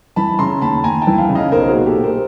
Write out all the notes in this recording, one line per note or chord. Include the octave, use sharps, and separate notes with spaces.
E3 A5 B5
C#3 A#5 C6
D#2 A5 B5
D#2 G#5 A#5
G5 A5
E3
F5 G5
C#3
D#5 F5
B1 A#4 C5
F#4 G#4
A#2
G4 A4
A#2
A#4 C5